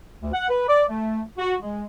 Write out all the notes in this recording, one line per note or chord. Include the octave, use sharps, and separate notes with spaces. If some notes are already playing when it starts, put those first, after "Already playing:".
D2
F#5
B4
D5
A3
F#4
G#3